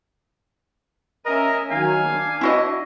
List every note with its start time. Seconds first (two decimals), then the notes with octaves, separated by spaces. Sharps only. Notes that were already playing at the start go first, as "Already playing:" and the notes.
1.25 C#4 A#4 D#5 E5 G#5
1.71 D#3 F#3 F5 G#5
2.11 D4
2.41 E4 F#4 D#5